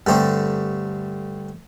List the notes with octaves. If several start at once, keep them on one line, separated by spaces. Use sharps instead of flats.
G2 D3 A3 C4 G4